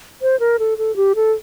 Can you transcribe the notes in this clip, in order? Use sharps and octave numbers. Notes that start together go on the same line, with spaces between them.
C5
A#4
A4
A4
G4
A4